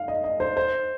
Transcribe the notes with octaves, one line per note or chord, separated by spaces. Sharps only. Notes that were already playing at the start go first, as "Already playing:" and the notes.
Already playing: F5
D#5
D#5
C5
C5